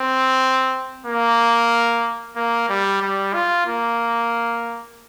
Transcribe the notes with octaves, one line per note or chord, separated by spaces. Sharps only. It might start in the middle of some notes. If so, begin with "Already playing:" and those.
Already playing: C4
A#3
A#3
G3
G3
F4
A#3